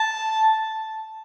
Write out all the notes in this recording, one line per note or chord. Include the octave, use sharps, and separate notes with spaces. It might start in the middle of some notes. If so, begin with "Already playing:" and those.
Already playing: A5